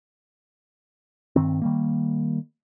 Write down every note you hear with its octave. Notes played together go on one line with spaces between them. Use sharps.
G2 D#3 C4
D#3 G3 A#3